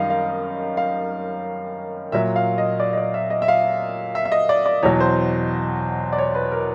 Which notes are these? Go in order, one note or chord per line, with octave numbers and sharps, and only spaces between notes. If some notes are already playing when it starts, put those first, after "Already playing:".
Already playing: F#2 D#3 G3 C#5 D#5 F5
F5
F5
A#2 F#3 E5
F5
D#5
D5
D#5
D5
E5
D#5
E5
F5
E5
E5
D#5
D5
D5
E2 B2 F#3 C#5
C5
D5
C#5
B4
A#4